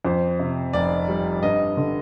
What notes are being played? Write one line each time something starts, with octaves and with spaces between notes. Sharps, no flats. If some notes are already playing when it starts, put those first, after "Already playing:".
F2 C5
C3
F1 D5
G3
G2 D#5
D3